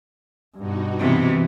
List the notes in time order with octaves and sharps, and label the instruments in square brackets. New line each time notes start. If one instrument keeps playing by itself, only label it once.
[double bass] G2 [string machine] B2 D#4 F#4
[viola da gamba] C3 B3 [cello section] E3